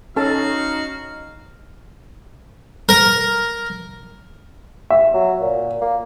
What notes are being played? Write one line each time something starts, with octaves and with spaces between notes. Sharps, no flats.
C#4 D#4 F#4 A4 F5 A5 F6
A#4
E5
F#3
A#2
A#3